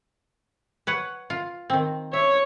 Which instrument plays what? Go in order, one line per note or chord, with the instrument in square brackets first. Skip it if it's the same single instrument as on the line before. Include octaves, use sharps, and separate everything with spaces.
[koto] B4 C#5 F#5
F4
D#3 C4
[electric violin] C#5 [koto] E5